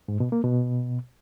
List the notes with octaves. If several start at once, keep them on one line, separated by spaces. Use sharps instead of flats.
G#2
B2
A#3
B2